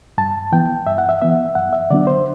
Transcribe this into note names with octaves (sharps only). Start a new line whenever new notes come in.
G2 A5
E3 B3 G5
G2 E5
F#5
E5
E3 B3 E5
F#2 F#5
E5
D3 F#3 B3 D4 D5
C5